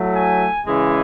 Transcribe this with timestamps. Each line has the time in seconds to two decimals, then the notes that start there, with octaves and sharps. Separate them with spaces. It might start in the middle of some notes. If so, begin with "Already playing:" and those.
Already playing: A2 F#3 A3
0.16 G#5
0.66 C#3 E3 G#3